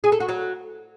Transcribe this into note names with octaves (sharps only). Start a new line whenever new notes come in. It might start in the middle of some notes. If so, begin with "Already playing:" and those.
G#4
A4
F#4
F#3